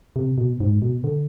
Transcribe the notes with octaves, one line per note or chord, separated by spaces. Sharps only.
C3
B2
G#2
B2
D3